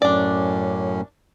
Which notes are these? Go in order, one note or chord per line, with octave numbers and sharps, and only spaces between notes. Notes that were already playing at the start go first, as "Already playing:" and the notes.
F#2 A2 C#4 D4 D5